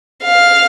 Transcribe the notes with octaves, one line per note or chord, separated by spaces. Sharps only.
F5